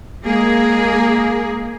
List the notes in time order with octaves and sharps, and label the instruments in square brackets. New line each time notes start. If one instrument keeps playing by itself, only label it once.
[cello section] G#3 A#3 G#4